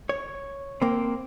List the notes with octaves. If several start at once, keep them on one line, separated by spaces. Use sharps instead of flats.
C#5
A#3 C4